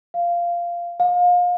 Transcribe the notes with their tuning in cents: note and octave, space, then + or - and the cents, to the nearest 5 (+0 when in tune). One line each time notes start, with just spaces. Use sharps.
F5 -10
F5 +30